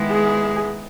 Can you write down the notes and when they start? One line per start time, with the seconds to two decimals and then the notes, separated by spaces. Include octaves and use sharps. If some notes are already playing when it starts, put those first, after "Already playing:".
Already playing: D#3 G#3 B3 E4
0.11 G#4